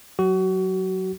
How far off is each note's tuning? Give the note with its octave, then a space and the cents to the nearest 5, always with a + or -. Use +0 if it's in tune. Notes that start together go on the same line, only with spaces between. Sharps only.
F#3 +0 F#4 +30